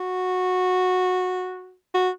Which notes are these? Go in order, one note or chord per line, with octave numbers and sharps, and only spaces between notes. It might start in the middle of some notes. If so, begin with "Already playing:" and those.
Already playing: F#4
F#4